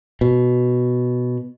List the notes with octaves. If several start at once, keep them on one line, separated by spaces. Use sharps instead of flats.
B2